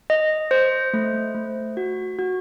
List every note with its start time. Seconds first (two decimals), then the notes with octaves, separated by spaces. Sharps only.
0.10 D#5
0.51 C5
0.94 A3
1.34 A3
1.77 F#4
2.19 F#4